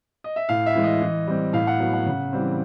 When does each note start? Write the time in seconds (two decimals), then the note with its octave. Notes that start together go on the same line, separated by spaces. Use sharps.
0.24 D#5
0.36 E5
0.49 A2 F5
0.66 E5
0.75 E3 G#3
0.84 D#5
1.02 E3
1.27 G3 C4
1.53 A2 F5
1.67 F#5
1.79 F#3 B3
1.93 F#5
2.06 C#3
2.33 E3 G3 C4